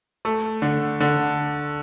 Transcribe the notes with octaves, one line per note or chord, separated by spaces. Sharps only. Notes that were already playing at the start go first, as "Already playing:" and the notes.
A3
D3
D3